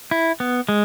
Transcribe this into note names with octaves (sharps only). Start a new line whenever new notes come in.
E4
B3
G#3